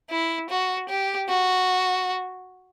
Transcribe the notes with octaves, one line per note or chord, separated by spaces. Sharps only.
E4
F#4
G4
F#4